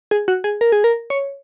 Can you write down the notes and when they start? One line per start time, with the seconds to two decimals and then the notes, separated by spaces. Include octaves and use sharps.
0.11 G#4
0.28 F#4
0.44 G#4
0.61 A#4
0.72 G#4
0.84 A#4
1.10 C#5